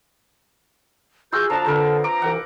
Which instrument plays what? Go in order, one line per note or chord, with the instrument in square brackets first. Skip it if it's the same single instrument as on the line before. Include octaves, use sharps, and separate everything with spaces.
[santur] F4 F#4 E6 [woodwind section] G#4 [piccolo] G6
[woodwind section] D3 A#5 [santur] F3 D4 [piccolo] A5
[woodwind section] D3 [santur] C4 A#4 B4
[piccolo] A#5 [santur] D6
[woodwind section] C2 E3 [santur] F#5